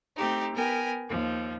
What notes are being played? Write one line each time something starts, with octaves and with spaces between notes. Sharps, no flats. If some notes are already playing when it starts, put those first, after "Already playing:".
A3 C4 D#4 G4
B3 A#4 G5 G#5
D#2 F3